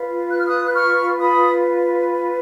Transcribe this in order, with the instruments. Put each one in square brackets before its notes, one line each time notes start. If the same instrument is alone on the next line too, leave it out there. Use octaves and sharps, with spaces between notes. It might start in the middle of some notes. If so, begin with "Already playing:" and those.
Already playing: [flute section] F4 B4
F#6
F6
D#6 F#6
F#6
C#6 F6
B5 D#6